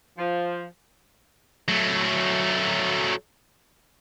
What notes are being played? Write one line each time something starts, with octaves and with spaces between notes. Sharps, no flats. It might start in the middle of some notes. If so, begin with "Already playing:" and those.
F3
F#3 A3